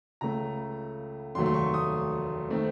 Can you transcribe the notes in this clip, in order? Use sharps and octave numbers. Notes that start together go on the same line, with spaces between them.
C#2 C#3 A3 A#5
F1 D#2 D#3 F#3 A3 C6
C6
C#6
D#6
D#3 A3 C4